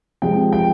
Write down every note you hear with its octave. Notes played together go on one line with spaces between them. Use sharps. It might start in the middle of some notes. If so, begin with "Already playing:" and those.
C3 F3 G#3 G5
G5